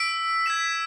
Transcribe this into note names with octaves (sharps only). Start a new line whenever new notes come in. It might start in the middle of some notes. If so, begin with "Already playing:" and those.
Already playing: E6 B6 D7
G#6 B6 E7